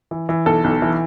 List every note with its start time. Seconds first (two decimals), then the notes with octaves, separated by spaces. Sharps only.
0.11 E3
0.29 E3
0.46 B1 A4
0.64 B1
0.82 E3